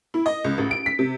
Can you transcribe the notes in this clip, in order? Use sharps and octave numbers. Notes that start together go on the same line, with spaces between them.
E4
D#5
C#2
A1
D7
B6
C3